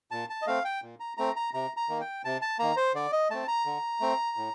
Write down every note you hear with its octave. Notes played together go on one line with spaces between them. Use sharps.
A#2 A5
A5
D#5
A3 C4 F5
G5
A#2
A#5
A3 C4 A#5
A#5
C3 A#5
A#5
D#3 A#3
G5
C3 A5
A5
D#3 A#3 A#5
C5
D3 D5
D#5
A3 C4 A5
A#5
D3
A3 C4
A2